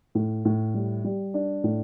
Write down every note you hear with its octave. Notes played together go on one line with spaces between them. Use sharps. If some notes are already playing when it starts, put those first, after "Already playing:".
A2
A2
G3
G3
D4
A2